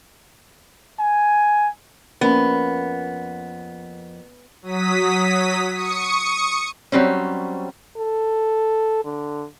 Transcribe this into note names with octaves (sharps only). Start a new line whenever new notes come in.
G#5
F2 A#3 B3 C#4
F#3 D#6 B6
C#6 D#6 C#7
F#3 G3 C4 C#4
A4
D3